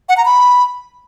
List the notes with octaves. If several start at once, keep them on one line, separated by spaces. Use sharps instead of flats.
F#5
A#5
B5